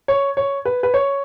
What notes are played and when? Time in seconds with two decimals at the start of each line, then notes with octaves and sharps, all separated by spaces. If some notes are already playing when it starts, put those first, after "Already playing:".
0.08 C#5
0.37 C#5
0.65 B4
0.83 B4
0.94 C#5